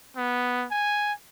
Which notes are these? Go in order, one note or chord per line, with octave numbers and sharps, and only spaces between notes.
B3
G#5